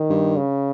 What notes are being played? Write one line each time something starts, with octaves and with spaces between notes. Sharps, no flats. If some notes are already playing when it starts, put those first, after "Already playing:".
Already playing: D#3
G2
C#3